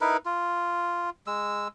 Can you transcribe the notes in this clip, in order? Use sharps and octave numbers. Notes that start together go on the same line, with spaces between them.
D#4 E4 A#4 B4
F4
G#3 E6